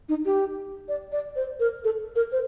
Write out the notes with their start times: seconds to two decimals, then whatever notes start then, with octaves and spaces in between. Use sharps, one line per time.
0.09 D#4
0.25 G4
0.88 D5
1.12 D5
1.36 C5
1.60 A#4
1.84 A4
2.16 A#4
2.32 C5